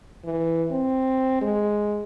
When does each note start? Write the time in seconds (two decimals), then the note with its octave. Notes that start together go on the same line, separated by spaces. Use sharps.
0.25 E3
0.71 C4
1.41 G#3